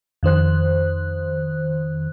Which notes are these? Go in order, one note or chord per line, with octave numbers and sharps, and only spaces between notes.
F2 D#3 C5 F#6